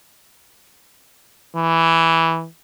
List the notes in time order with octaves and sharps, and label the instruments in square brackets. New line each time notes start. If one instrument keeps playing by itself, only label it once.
[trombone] E3